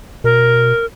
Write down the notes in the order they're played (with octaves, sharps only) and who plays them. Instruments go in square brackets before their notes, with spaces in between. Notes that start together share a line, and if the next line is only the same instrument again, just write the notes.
[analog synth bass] B2 [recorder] A#4